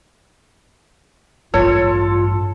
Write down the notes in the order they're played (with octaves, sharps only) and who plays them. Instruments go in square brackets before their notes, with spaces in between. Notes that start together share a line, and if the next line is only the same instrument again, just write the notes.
[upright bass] A1 G2 [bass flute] F4 [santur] A4 [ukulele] C#5